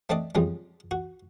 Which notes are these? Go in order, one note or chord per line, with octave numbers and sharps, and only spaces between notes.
A3 C4 D4 D5 D#5
F2 C#3 G3 G#3
F#4